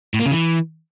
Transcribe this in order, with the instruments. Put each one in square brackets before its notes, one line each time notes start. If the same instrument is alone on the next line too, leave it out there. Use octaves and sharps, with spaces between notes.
[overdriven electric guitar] A2
A#3
C#3
E3